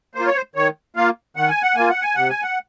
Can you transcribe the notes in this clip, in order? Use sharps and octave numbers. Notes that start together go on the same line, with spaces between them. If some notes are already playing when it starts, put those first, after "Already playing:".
A#3 F4 C5
C#5
C5
D#3 C#5
A#3 F4 F5
D#3 F#5
G#5
F#5
A#3 F4 G#5
F#5
G#5
C3 F#5
G#5
F#5